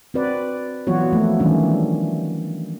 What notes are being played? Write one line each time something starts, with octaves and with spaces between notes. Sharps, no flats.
C4 F#4 B4 D5
E3 F#3 B3 F4 F#4 C#5
F3 A3 A#3
D#3 E3 G3 A3 C#4 D4